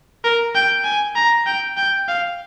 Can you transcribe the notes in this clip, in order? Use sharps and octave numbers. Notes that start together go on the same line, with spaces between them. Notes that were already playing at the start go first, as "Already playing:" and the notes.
A#4
G5
G#5
A#5
G5
G5
F5